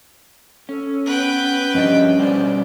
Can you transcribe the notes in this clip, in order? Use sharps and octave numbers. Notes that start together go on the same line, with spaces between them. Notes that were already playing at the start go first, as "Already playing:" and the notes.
C#4 A4
B3 B4 G5
F3 G3 C#4 D4 D#5
B2 G3 G4 C5 D5